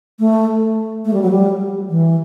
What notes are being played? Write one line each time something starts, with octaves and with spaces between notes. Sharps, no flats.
A3
A3
G3
F#3
G3
E3